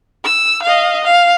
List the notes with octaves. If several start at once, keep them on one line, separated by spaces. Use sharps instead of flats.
E6
D#5 F5
F5